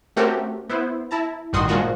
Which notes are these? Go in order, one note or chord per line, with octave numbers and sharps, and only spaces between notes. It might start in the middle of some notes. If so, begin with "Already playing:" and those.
A3 C4 C#4 F#4 G4 A#4
B3 E4 C5
E4 A5 A#5
A1 G2 D#3 F#4 C6 D#6
A#2 F3 G#3 F4 F#4 A#4